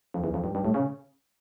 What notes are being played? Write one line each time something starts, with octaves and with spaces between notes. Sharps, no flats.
F2
E2
F2
G2
G2
A2
C#3